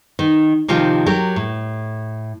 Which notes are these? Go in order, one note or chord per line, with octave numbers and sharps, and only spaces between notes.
D#3
C3 D#3 F3 F4 G4
F#3 G4 A#4
A2